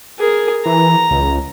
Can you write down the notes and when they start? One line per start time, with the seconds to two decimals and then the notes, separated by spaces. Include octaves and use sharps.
0.19 G#4 A#4
0.66 E3 A#5
1.11 C#2